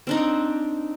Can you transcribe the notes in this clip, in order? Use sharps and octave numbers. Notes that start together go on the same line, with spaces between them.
C4 D4 D#4